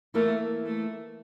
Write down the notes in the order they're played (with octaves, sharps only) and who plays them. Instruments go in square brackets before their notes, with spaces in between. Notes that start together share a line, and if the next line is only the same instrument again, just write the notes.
[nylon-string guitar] E3 A#3 E4 A#4 [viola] A3
[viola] A3